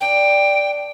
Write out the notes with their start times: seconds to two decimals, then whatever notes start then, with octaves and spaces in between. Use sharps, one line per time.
0.01 B3 D4 G5